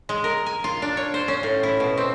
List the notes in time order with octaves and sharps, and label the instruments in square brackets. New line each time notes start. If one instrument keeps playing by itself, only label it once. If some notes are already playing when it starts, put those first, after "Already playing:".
[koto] G#3
A#4
G#5
F4
D4
C#5
C5
C#4
A2
E4
B2
C4